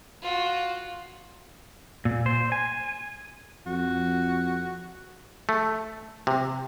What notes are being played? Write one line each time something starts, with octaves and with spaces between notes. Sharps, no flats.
F4 F#4
A#2
C5
G#5
F2 F#4
A3
C3